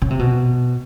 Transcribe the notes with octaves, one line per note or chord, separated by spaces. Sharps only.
C#3
C3
B2